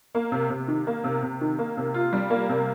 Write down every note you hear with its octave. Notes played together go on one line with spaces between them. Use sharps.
A#3
C3
C3
D#3
A#3
C3
C3
D#3
A#3
C3
F4
G3
A#3
C3